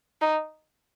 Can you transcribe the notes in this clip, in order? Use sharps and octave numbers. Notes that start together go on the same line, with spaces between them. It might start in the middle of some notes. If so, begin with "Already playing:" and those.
D#4